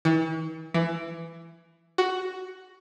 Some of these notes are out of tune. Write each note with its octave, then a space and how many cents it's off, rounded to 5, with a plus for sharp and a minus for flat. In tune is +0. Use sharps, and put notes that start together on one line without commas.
E3 -40
E3 +20
F#4 +10